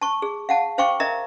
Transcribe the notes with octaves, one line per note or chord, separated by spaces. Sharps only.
A5 C#6
G#4
F5 F#5 A5
C5 F5 G5 C#6 D6
A#4 D#5 E5 A#5